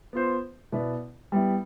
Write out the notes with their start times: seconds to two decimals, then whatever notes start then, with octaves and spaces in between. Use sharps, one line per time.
0.13 B3 F4 C5
0.72 B2 B3 E4 B4 D5
1.32 G3 B3 E4